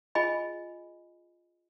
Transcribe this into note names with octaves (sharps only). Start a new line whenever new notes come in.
F4 G#4 D#5 G#5 B5